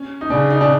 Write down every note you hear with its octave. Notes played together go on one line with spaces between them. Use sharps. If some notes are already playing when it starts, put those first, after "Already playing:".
Already playing: C#4
D#4
C#3 D4
D#4
D4